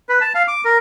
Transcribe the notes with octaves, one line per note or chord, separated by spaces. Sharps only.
B4
A5
F5
D6
A#4